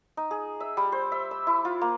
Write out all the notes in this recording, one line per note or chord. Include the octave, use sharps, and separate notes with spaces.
D#4
G#4
E5
G3
C5
E5
E6
E4
F4
A#3